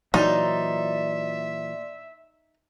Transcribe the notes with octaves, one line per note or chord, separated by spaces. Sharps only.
A#2 E3 F#3 D#4 D5 E5 C6